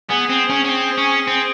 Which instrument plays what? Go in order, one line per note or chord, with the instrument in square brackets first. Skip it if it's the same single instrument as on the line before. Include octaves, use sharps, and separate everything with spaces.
[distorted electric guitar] B3 [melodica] G#4
[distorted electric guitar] C4
C#4
C#4
C4
C#4
C4